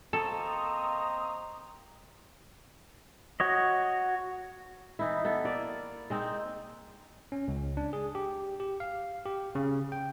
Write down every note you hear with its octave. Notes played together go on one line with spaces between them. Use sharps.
A#3 C4 A4 D#5 A#5 C#6 D#6
F#4 C#5 D#5
E3 D#4 E4
B3 E4 A4
A#3 D5
G#3 C4 D#4
C#4
C#2
D4
G#4
G4
G4
F5
G4
C#3
G5